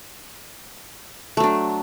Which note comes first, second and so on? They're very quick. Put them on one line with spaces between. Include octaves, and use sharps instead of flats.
A3 F#3 D4